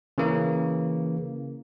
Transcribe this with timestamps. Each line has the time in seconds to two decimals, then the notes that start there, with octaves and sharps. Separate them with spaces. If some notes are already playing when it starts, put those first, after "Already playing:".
0.18 C#3 E3 A#3